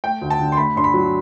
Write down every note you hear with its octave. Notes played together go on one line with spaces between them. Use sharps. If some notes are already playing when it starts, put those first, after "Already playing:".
A3 G5
D2
A5
D3
C6
A3 B5
G2 C6
B5
F#3